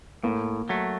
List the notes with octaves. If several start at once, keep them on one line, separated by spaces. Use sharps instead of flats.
A2 A#3
F#3 A3